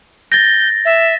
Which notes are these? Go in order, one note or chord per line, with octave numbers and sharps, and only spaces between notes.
G6 A6 A#6
E5